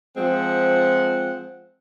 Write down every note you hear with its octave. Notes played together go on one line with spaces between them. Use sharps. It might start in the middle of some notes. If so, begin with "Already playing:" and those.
F3 G#3 C4 F#5